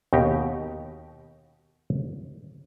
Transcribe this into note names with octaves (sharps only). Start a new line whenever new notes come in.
D#2 B2 D#4 G4